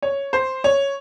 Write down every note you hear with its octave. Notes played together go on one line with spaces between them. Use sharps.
C#5
C5
C#5